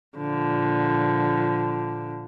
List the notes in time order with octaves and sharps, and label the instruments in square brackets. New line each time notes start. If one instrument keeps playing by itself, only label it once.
[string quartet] A#2 D3 F3